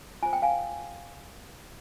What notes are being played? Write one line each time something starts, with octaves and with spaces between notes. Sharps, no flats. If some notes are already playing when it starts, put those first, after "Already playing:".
F4 C5 G#5
G5
F5 G#5